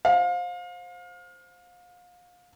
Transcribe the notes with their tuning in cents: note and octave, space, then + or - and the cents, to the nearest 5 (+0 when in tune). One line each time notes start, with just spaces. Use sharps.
C5 +0 F5 +30